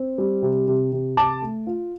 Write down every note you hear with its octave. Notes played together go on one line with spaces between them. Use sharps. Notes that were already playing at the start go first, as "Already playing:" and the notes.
Already playing: C4
G3
C3
C3
C3
C3 A5 D6
A3
F4